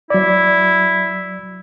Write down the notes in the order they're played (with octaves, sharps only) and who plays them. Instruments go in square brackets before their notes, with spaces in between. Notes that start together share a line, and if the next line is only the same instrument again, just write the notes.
[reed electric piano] F#3 D5 [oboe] E4